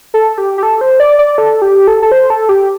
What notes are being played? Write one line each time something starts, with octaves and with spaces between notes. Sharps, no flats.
A4
G4
G4
A4
C5
D5
D5
A4
G4
A4
A4
C5
A4
G4